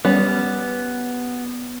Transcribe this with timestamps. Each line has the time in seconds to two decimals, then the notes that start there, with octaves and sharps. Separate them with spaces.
0.05 G3 B3 C#4